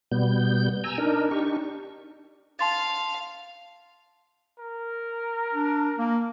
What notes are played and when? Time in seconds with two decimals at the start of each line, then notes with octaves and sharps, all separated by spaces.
0.11 B2 G3 B3 G6
0.84 G#5 A#5 E6
0.98 D4 D#4 A#4
1.31 D4 D#4 G4 C#6
2.59 F5 A5 C6 A6
4.59 A#4
5.54 D4
5.98 A#3